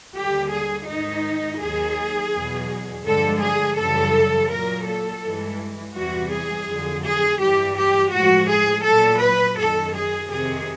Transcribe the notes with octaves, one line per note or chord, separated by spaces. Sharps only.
D#2 D3 G3 G4
G#4
G#2 D#3 G#3 D#4
D#2 D#3 F#3 G#4
E2 B2 F#3
G2 D3 F3 G#3 A4
G#4
F#2 C#3 E3 G3 A4
A#2 F#3 A#4
A4
G2 E3 G#3
E2 C3 E3 G3 F#4
G#4
F2 D3 F#3
G#4
G2 E3 G3 G4
G4
A2 F3 G#3 F#4
G#4
A#2 F#3 A4
B4
F#2 D#3 F#3 A4
G#4
F2 C3 D#3 G#4